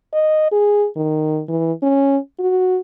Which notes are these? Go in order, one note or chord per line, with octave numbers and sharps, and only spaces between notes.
D#5
G#4
D#3
E3
C#4
F#4